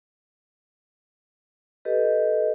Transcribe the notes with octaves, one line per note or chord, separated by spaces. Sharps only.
G4 A4 B4 D#5